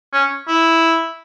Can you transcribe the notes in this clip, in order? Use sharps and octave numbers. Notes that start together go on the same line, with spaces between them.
C#4
E4